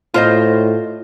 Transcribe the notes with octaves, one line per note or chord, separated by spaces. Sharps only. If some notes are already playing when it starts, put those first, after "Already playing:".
A2 F4 C5 D#5